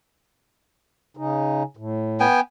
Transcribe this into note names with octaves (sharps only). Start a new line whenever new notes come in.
C#3 D#4
A2
B3 G5 G#5